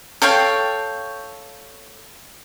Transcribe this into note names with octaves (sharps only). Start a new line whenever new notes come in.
A4 C#5 F5 G5